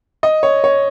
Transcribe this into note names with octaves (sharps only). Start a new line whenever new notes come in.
D#5
C#5
C#5